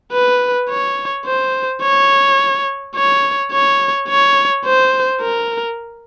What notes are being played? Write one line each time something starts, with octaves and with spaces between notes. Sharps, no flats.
B4
C#5
C5
C#5
C#5
C#5
C#5
C5
A#4